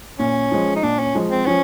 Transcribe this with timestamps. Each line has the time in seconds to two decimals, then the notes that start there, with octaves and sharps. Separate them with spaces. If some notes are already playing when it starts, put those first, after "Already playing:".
0.19 A#2 C#4
0.51 F3 G#3
0.76 D#4
0.83 A#2 D4
0.99 C#4
1.15 F3 G#3
1.31 C4
1.46 F3 C#4